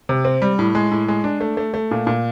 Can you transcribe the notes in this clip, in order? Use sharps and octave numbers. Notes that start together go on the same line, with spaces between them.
C3
C4
G3
A2
G#3
A2
G#3
D4
A3
A3
A3
A#2
A#2